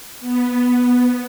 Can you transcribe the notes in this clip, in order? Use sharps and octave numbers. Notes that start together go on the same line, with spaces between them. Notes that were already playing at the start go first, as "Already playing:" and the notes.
B3